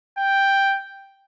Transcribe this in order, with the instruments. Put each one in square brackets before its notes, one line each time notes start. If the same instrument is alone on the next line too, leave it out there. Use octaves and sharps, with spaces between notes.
[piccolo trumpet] G5